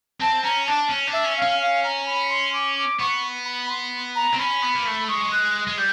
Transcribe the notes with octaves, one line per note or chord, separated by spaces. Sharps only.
C4 A5
C#4 A#5
D4 A5
C#4
D4
E5
C#4
F5
C#4
F5
A#5
B5
C6
D6
D6
B3 C#6
B5
C6
A#5
C4
C#4 B5
B3
A#3
A3
G#3 C#6
F#6
G#3
G3 G6